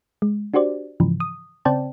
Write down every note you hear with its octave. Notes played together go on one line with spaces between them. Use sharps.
G#3
D4 F#4 G4 C5 D5
G#2 C#3 E3 F3
D#6
C#3 C4 C5 D5 G5 A5